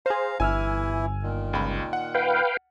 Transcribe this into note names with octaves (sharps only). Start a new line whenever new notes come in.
G#4 C5 F5 A#5
G1 E3 E4 G#5 E6 F6
A#2 D#3
C#2 B5
F#5
B4 F5 G5